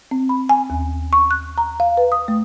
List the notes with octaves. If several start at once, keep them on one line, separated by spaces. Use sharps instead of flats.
C4
B5
G#5
D#2
C#6
F#6
A#5
F5
B4
D#6
A3